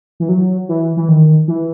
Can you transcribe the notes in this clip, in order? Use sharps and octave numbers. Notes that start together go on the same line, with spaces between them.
E3
F#3
E3
E3
D#3
E3